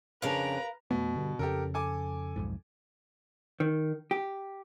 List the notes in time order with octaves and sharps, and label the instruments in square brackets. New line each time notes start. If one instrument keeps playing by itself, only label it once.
[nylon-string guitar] F2 C#3 D4 [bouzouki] A#4 F5 [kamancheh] B4 A#5
[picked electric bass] F2 A3 B3 [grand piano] B2
[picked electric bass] G2 D3
[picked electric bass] F2 C#3 [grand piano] G4 A4 A#4
[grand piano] A4 G#5 D6
[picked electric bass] B1 F2 G#2
[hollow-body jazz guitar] D#3
G4